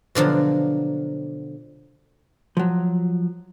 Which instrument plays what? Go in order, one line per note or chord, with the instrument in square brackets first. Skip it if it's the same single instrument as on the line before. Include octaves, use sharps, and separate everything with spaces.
[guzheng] B2 D3 F3 F#3
[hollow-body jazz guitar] F3 F#3